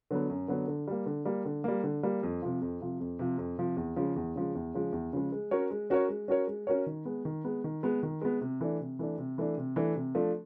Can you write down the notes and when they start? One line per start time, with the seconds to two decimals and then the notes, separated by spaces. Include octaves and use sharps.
0.11 D3 F#3 B3
0.30 F#2
0.48 D3 F#3 B3
0.68 D3
0.87 G3 A#3
1.06 D3
1.25 G3 A#3
1.45 D3
1.64 G3 A#3
1.83 D3
2.03 G3 A#3
2.23 F2
2.42 C3 F3
2.62 F2
2.80 C3 F3
3.01 F2
3.19 C3 F3
3.38 F2
3.58 C3 F3
3.77 E2
3.96 C#3 F3 G#3
4.16 E2
4.36 C#3 F3 G#3
4.55 E2
4.74 C#3 F3 G#3
4.93 E2
5.13 C#3 F3 G#3
5.32 G#3
5.51 C#4 F#4 A#4 C#5
5.71 G#3
5.90 C#4 F#4 A#4 C#5
6.09 G#3
6.28 C#4 F#4 A#4 C#5
6.47 G#3
6.67 C#4 F#4 A#4 C#5
6.86 D#3
7.05 G#3 B3
7.25 D#3
7.45 G#3 B3
7.64 D#3
7.83 G#3 B3
8.03 D#3
8.22 G#3 B3
8.41 C3
8.61 E3 A3 D4
8.80 C3
8.99 E3 A3 D4
9.18 C3
9.38 E3 A3 D4
9.57 C3
9.76 E3 A3 D4
9.96 C3
10.15 F3 A3 D4